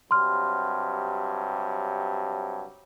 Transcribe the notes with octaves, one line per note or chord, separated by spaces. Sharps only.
G2 C3 F#3 C6 F6